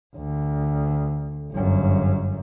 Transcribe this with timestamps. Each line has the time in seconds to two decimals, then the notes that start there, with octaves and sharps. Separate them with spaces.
0.16 D2
1.52 G1 F#2